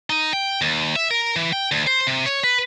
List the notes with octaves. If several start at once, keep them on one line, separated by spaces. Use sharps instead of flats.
D#4
G5
D#2
E5
A#4
E3
G5
D2
C5
C3
C#5
B4